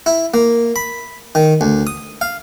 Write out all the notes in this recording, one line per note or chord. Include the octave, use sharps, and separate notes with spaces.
E4
A#3
B5
D#3
D2
D#6
F5